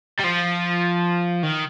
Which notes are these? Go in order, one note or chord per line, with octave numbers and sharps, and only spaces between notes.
G3
F3
D#3